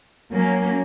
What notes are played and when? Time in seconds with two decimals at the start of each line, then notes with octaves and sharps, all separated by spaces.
0.31 F#3 A#3 C#4